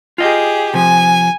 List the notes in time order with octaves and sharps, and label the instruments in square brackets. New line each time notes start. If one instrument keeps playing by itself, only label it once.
[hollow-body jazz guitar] F4 D#5 [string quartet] G4 G#4
[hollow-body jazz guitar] C3 F3 [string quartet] G#5